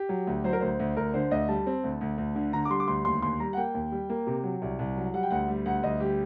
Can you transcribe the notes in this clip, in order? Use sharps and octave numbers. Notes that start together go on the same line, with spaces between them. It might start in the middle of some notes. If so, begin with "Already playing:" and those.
Already playing: G4
F#3
D2
F#3 C5
A#4
D2 C5
D2
D2 A#4
D3 C5
D2 D#5
G3 A5
C4
D2
D2
D2
D3
D3 A#5
D6
G3 C6
D6
D2 C6
D#2 C6
D#2 C6
G3 A#5
F#5
A#3 G5
D#2
G3
A#3
C3
F#3
C2
C2
F#3
G3 F#5
G5
D2 F#5
G3
D2 F#5
D2 D#5
G3 G4